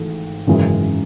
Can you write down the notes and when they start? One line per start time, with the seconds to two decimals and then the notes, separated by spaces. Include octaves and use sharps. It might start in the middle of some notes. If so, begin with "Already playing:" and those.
Already playing: G#1 G#2 E3 A3
0.47 G#1 F#2 C#3 E3 G#3